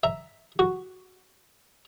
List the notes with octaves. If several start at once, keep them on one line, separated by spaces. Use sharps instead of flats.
E5 A#5
F#4